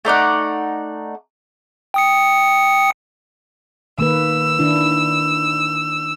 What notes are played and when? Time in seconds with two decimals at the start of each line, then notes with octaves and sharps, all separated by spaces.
0.05 A3 D#4 D5 F#5
1.94 G5 D#6 C#7
3.99 D#3 A#3 B4 E6
4.59 D#3 D4 E4